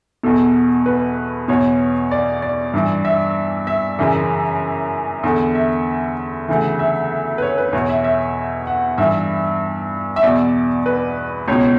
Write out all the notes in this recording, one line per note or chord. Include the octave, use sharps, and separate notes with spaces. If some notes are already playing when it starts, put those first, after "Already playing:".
E2 B2 A4
B4
E2 B2 C#5
D5
D5
G2 E3
E5
E5
F#2 C#3 E3
E2 D3
E5
D2 C#3 E3
E5
B4
C#5
B4
E2 B2 C#5
E5
E5
F#5
G2 E3 E5
E5
E2 B2 D5
B4
C#2 B2 C#5